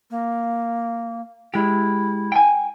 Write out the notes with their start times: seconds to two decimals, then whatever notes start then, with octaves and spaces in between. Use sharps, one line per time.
0.11 A#3
1.54 G#3 E4 G4
2.32 G5 G#5